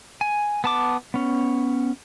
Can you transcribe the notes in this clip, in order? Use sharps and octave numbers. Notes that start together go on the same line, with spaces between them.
G#5
B3 A5 D6
B3 C#4